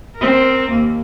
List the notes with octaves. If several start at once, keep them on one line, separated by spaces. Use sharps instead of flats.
C4 A#4
D#2 A#3